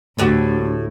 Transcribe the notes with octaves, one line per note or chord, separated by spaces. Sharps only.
D2 A2 F#4 G4